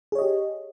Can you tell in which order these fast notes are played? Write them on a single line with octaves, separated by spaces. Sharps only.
G#4 C#5 D#5 G4